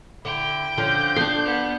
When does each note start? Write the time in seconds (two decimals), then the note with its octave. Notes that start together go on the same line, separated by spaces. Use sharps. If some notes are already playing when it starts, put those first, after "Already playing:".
0.25 D3 E4 G5
0.78 D3 F3 C#4 G6
1.16 F3 D4 A4 C6
1.45 B3